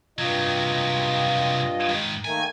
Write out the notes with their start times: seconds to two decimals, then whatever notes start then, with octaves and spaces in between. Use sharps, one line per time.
0.19 G2 C3 F#3 F4 D#5
1.89 G#2 D#3
2.25 D#3 A3 A#3 G#5